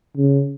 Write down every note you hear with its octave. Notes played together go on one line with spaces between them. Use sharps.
C#3